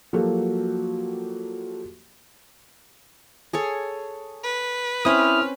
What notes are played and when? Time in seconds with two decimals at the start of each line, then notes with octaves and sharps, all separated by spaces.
0.13 F3 F#3 A#3 F#4 G4 A4
3.53 G#4 A4 C#5
4.43 B4
5.05 C4 C#4 E4 D#6 F6